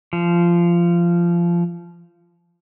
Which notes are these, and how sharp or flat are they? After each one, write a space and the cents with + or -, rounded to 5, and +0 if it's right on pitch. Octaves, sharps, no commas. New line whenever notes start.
F3 -20